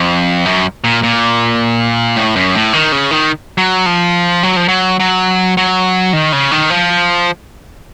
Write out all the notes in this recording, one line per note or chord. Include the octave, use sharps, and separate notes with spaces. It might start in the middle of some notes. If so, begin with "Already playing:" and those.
Already playing: F2
F#2
A#2
A#2
A2
F#2
A2
D#3
C#3
D#3
F#3
F3
F#3
F3
F#3
F#3
F#3
D#3
C#3
D#3
F3